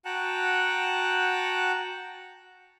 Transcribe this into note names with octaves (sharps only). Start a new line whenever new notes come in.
F#4 F#5 G5 A5 A#5 F#6